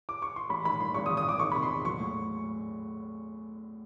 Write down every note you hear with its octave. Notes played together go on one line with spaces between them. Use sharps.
D6
C#6
C6
A1 B5
D#3 B5
G2 C6
G#1 C#6
D#6
G#1
D#6
G#1 D6
D#3 C#6
C3 B5
C6
E2
F#3 C#6
A2